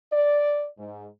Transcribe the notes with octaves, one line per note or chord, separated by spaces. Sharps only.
D5
G#2